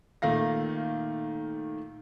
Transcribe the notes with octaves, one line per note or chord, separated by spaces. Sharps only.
A#2 D#3 A3 F5 A#6